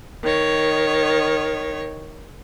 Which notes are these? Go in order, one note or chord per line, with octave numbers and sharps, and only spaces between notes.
D#3 C#5